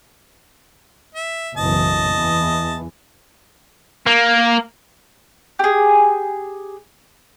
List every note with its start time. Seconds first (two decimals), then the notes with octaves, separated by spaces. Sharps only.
1.15 E5
1.57 F#1 B1 E3 D#5 A5
2.11 E2 E3
4.07 A#3
5.59 G4 G#4